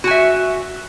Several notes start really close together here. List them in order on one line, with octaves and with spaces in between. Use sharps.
F#4 G#5 E5